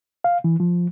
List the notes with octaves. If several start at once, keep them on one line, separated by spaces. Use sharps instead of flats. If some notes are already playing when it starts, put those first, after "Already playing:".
F5
E3
F3